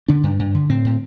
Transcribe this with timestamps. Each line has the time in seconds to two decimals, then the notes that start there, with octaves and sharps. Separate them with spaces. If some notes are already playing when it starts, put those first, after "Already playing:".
0.08 D3 D4
0.23 G2
0.39 G2
0.54 D3
0.69 A2 C4
0.85 A2